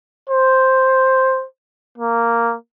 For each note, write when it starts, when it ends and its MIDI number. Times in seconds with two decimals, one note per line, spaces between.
0.30 1.45 72
1.98 2.56 58